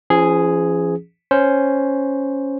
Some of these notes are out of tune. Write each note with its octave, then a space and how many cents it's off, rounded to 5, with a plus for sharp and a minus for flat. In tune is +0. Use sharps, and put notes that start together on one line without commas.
F3 -40 C#4 +0 G#4 +0
C#4 +0 C5 +0